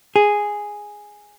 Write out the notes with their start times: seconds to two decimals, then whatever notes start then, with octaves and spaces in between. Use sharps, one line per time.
0.16 G#4